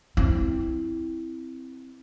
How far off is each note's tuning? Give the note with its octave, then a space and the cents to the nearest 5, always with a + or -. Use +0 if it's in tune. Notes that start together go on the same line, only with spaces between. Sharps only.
C4 +0 E4 -5